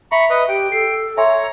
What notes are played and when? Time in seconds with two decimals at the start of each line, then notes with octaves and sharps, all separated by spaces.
0.12 E5 A#5 B5 C#6
0.30 B4 D#5
0.49 G4 G5
0.72 A4 C7
1.17 C#5 E5 G#5 A#5 C6